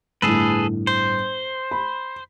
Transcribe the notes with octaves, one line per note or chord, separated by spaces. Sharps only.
G1 A2 G#4 A4 B4
C5
B5